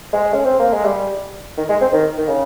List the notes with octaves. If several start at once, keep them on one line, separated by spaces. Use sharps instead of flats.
G#3
C#4
C4
A#3
G#3
G3
D#3
G#3
C4
D#3
D#3
C#3